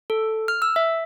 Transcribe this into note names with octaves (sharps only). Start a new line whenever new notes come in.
A4
F6
E6
E5